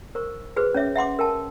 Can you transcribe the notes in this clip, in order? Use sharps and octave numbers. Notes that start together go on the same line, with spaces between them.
A#4 C5 C#6
F#4 G#4 B4 C5
C#4 C#5 E5 D6
E5 F#5 C6 D6
A#4 G5 A5